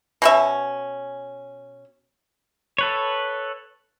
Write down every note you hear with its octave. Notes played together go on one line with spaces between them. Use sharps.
B2 C#4 E5
A4 B4 C#5